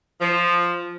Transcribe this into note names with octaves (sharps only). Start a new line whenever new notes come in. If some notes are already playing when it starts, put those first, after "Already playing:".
F3